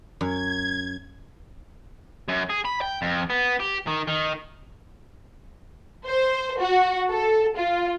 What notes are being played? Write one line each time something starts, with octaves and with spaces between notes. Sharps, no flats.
F#2 G#6
F#2
G#4
B5
G5
F2
B3
G4
D#3
D#3
C5
F#4
A4
F4